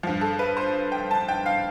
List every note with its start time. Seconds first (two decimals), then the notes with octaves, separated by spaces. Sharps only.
0.03 G2 F3
0.21 A4
0.39 B4
0.57 C5
0.92 G5
1.11 A5
1.28 G5
1.46 F5